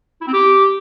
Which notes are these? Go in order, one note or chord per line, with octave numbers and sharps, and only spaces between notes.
E4
C4
G4